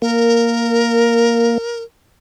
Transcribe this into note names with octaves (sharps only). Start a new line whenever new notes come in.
A#3 A#4